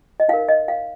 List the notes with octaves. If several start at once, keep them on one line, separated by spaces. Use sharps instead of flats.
D#5
D#4 A#4 F5
D#5
F5